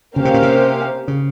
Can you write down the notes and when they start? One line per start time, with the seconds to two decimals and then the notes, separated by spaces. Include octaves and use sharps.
0.16 C#3 A#3 C#4 G4 C5 F5
0.25 C3
0.34 A#2
0.42 C3
1.08 C#3